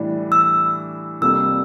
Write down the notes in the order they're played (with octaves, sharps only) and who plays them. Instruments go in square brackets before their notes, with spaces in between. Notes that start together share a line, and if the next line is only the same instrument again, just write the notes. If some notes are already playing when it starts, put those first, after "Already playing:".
Already playing: [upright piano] A2 E3 G3 D4
[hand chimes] E6
[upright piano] F2 C3 G3 A#3 D4 [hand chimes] E6